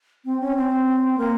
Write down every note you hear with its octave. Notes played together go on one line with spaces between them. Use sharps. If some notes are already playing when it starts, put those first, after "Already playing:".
C4
C#4
C4
A#3